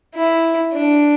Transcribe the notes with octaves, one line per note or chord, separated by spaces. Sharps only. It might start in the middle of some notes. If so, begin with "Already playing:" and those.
E4
D4